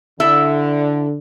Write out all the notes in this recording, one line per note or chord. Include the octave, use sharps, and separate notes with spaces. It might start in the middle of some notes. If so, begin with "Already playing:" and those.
D3 E4 A4 E5